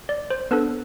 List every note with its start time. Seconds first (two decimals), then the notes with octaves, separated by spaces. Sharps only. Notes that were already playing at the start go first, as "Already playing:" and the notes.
0.09 D5
0.30 C5
0.51 B3 D4 A4 B4